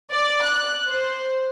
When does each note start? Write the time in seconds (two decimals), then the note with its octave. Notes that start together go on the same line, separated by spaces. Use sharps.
0.11 D5
0.42 F#6
0.87 C5